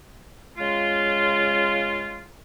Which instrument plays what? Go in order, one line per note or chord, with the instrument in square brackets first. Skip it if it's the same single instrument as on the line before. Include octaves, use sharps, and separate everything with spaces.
[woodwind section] C#3 G#3 F4